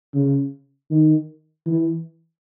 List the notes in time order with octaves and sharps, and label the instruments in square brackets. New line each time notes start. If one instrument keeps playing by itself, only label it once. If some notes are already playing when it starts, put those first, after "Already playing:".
[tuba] C#3
D#3
E3